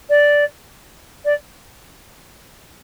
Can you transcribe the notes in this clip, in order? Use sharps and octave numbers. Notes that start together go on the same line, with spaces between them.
D5
D5